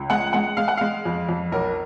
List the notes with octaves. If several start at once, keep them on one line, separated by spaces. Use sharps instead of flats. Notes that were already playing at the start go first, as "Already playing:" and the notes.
Already playing: C#2
G#3 F#5
G#3 F#5
G#3 F5
F#5
G#3 F5
F2
F2
B1 A#4